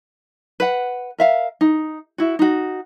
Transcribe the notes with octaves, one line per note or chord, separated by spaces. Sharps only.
B4 F#5
A#4 E5 F5
D#4
E4 F#4
D#4 F#4